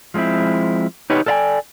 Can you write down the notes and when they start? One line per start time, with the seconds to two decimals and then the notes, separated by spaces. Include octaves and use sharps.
0.14 F3 G#3 B3 C4 E4
1.10 D#4 G4 B4 C#5
1.26 A4 A#4 D5 F5 G5 G#5